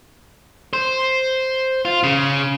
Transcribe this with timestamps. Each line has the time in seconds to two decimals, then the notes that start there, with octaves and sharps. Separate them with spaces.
0.73 C5
1.85 F4
2.03 C#3